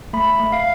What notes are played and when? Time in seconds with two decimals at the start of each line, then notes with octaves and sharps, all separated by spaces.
0.13 A3 B5
0.39 A3
0.52 F5